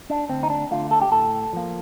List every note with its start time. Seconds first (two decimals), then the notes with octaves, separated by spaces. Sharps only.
0.10 D4
0.30 D2 C4
0.43 D#4
0.50 D4
0.71 D3 A3 F4
0.91 A4
1.02 G4
1.11 A2 A4
1.53 F3 A#3